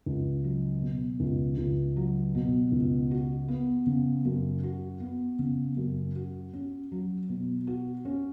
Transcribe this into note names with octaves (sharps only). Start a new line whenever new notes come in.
C#2
F#3
B2
C#2
C#2
F#3
B2
C#2
F#4
B3
C#3
F#2
F#4
B3
C#3
F#2
F#4
C#4
F#3
B2
F#4
C#4